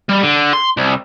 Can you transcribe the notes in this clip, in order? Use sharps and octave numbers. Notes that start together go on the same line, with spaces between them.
G3
D3
C6
C2